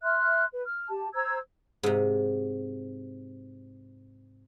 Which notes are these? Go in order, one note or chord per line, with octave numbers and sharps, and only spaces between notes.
E5 C6 F6 F#6
B4
F6
G4 A5
C5 A#5 E6 G#6
G#2 C3